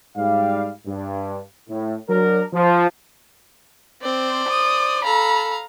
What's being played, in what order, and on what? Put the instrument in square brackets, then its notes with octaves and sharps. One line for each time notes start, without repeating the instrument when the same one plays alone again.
[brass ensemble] G#2 G3 F5
G2
A2
F#3 D4 A#4
F3
[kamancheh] C4 [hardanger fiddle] C5 D5
[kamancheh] D#6
[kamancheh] A4 B5 [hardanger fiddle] F5 A#5